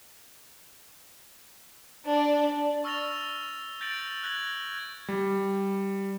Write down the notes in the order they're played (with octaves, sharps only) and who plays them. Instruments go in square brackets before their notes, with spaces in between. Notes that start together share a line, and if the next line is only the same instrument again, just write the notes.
[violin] D4 D5
[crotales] C#6 E6 F6 A6 A#6 F7
G6 A6 A#6 D7 F#7
F#6 G#6 A#6 F#7
[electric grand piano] G3